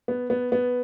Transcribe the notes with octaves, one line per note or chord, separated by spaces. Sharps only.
B3
B3
B3